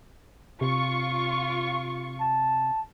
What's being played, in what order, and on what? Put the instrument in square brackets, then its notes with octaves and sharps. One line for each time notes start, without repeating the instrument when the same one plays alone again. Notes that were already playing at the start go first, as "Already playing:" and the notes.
[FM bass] C3 [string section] F4 C#6
[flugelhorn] A5